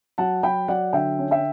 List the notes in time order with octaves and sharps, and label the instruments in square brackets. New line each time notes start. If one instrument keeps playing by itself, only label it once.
[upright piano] F#3 F#5 A5
F#3 G5 B5
F#3 D5 F#5
D3 E5 G5
C#4
E5 G5